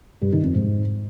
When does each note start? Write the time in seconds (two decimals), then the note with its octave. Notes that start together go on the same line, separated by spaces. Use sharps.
0.22 G2
0.33 D#3
0.43 F2
0.54 G#2